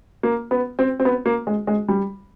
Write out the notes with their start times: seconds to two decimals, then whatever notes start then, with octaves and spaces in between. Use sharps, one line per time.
0.23 A#3
0.51 B3
0.79 C4
1.00 C4
1.05 B3
1.26 A#3
1.47 G#3
1.67 G#3
1.88 G3